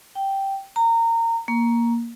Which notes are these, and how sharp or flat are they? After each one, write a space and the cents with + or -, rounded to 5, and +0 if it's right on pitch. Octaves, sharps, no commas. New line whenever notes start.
G5 -5
A#5 -25
A#3 +5